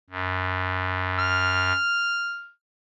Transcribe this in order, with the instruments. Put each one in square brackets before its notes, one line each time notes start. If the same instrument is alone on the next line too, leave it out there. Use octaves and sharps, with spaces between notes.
[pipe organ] F#2
[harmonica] F6